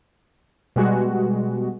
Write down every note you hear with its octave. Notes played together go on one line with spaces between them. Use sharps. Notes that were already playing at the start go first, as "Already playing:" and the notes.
B2 G3 G#3 F#4